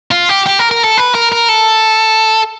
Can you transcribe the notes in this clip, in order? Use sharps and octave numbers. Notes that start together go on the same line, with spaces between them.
F4
G4
G4
A#4
A#4
A4
B4
A#4
A#4
A4